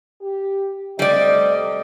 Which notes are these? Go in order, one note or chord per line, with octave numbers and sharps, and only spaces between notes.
G4
C3 G3 A3 D5 D#5